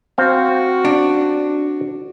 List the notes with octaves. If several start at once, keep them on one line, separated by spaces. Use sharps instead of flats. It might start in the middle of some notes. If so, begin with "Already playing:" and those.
C4 F#4 F5
D4